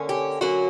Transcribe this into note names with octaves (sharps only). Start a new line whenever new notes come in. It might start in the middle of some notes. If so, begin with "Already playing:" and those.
Already playing: D3 A#3 C#4
G4
D3 F#3 A#3 C#4 F#4